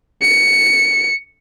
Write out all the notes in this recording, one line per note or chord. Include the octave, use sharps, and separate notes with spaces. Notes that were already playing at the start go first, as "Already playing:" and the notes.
C#7